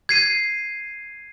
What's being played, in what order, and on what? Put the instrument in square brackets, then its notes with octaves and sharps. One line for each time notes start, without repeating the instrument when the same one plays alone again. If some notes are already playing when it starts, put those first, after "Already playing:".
[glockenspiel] G#6 C7 D#7